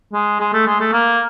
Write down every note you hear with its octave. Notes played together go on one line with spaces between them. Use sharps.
G#3
G#3
A3
G#3
A3
A#3